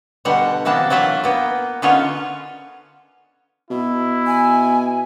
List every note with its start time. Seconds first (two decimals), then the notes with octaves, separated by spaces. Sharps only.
0.25 B2 D3 G3 F#5
0.65 C3 E3 A#3 B3 D4 A5
0.90 F#3 E4 F4 E5 F5
1.24 A#3 B3 G5
1.82 D3 B3 C#4 D#4 F4 C#5
3.71 B2 E4
4.27 G#5